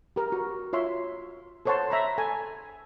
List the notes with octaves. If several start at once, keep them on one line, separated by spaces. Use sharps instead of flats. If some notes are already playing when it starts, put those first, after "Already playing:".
G4 A#4
F#4
F4 C#5 E5 C6
A4 C5 C#5 F#5 A5 C6
E5 A#5 B5
A4 G#5